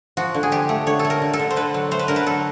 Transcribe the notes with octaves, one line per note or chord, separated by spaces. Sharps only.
F3 F#4
D3
G#4
F3 G4
A3
D3 C#5
A4
A3
A#4
D3
A4
D3
C5
D3 B4
F#3
A3 C5
B4
D3 A#4
B4
F#3 A4